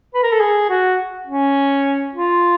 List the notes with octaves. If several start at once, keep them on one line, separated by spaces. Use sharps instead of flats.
B4
A#4
A4
G#4
F#4
C#4
F4